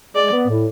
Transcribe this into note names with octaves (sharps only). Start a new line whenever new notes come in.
G#3 D5
B3
A2